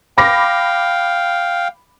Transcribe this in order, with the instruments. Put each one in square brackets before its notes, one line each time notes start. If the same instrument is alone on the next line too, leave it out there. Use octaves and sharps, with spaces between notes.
[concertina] F5 G5 [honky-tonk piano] B5 D6 A#6